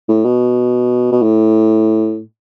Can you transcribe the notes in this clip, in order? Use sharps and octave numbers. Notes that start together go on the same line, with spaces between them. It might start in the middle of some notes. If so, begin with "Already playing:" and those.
A2
B2
B2
A2